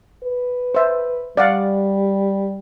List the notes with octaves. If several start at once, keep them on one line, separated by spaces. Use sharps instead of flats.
B4
C5 E5
G3 D5 F5 F#5